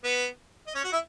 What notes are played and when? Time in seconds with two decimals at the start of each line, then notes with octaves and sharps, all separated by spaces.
0.04 B3 B4
0.67 D#5
0.75 C#4 C#5
0.84 F#4 F#5
0.92 E4 E5